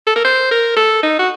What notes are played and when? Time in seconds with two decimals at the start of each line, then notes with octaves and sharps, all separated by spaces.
0.07 A4
0.16 A#4
0.25 C5
0.51 A#4
0.76 A4
1.03 D#4
1.19 F#4